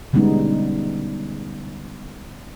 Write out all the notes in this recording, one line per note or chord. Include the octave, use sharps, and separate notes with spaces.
D3 G3 G#3 B3 C#4 D#4